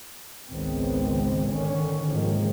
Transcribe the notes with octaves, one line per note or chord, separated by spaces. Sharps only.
G#1 C#2 G#2 D#3 B3 C4
D3 D#3 C#4
G#2 C3 D#3 F3 G#3 A#3